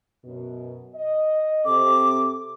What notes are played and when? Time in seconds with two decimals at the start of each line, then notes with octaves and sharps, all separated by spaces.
0.24 F#2 B2
0.95 D#5
1.65 C3 C4 A4 D6